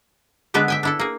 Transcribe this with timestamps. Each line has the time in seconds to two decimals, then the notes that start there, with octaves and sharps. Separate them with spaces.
0.54 D3 G#3 B3 D4 B4 E5
0.68 E5 G5 G#5
0.83 D4 E4 A4
0.99 A#3 G#4